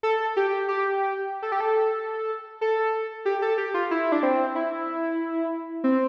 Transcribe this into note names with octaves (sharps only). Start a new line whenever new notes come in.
A4
G4
G4
A4
G4
A4
A4
G4
A4
G4
F4
E4
D4
C4
E4
C4